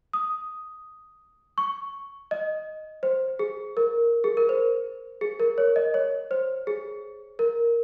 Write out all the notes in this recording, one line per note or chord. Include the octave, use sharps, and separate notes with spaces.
D#6
C#6
D#5
C5
G#4
A#4
G#4
A#4
C5
G#4
A#4
C#5
D#5
C#5
C5
G#4
A#4